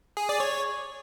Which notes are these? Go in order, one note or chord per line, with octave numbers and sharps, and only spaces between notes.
G#4
D5
C#5